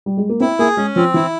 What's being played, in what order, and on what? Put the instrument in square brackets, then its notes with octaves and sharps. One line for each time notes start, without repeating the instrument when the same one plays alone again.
[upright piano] G3
G#3
A#3
[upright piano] C4 [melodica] E4
[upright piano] A#3 [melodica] G#4
[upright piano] G#3 [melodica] C#4
[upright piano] F3 [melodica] C4
[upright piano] E3 [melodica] E4